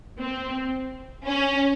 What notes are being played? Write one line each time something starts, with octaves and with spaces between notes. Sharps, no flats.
C4
C#4